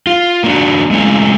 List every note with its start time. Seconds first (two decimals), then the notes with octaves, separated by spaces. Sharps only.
0.07 F4
0.44 A#3 D4 F#4
0.91 G#3 A3 C#4 E4